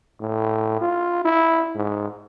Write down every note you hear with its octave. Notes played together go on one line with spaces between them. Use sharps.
A2
F4
E4
G#2